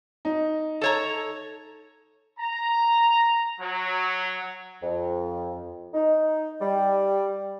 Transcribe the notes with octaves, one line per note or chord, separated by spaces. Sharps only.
D#4
A4 C#5 A#5
A#5
F#3
F2
D#4
G3